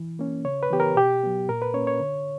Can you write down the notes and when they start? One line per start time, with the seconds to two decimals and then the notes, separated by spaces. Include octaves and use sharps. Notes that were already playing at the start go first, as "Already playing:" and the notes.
Already playing: E3
0.19 A#3 C#4
0.45 C#3 C#5
0.63 B4
0.70 E3 B3 G4
0.80 A#4
0.96 B2 G4
1.23 F#3 B3
1.49 A#2 A#4
1.62 B4
1.74 A#3 C#4 C#5
1.87 C#5
2.00 D3